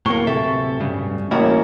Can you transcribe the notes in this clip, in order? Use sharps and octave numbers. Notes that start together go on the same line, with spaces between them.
D1 A2 A#3 C#6 G7
C3 A4 E5
G2 C#3
A1 A#3 C#4 E4 F#4 C#5